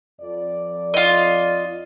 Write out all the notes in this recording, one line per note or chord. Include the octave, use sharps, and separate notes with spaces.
F2 D5
F4 D#5